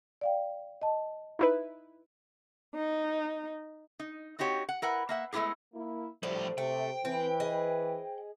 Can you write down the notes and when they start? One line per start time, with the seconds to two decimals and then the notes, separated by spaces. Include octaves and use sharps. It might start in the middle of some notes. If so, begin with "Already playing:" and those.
0.21 D5 F5 G5
0.82 D#5 A5
1.39 D#4 E4 B4
2.75 D#4
3.99 D#4
4.39 C4 D#4 F#4 G4 C#5
4.69 F#5
4.82 E4 A#4 B4 F#5
5.09 A#3 E5 F#5
5.33 G#3 A3 B3 E4 G4 G#4
5.74 A#3 E4
6.23 A2 D3 F3 G3 A3 C5 D5
6.58 C3 A3 G5
7.05 E3 C4 B4
7.40 G#4 D#5